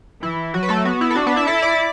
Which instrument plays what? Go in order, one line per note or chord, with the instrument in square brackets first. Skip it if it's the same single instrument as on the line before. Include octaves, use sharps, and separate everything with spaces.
[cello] E3 [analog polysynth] E4
[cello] F#3 [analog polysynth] F#4
[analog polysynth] B4
A3 A4
[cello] B3 [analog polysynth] F#4
[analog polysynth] E4
A4
[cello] D4 [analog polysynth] F#4
[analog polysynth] B3 B4
E4 E5
[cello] E4 [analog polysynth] A4 A5
[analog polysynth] D5 D6